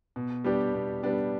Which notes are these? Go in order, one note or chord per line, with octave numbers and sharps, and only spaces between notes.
B2
G3 B3 D4 G4
B2
G3 B3 D4 G4